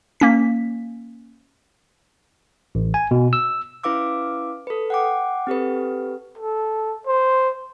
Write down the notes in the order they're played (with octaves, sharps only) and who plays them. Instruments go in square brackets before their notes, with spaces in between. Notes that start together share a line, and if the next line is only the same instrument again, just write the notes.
[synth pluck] A#3 C#4 B6
[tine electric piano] A1
G#5
B2
E6
[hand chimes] C#4 E4 B4 F5 D6 E6
A4 B4
F#5 G5 D6
C4 G4 A4 B4
[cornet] A4
C5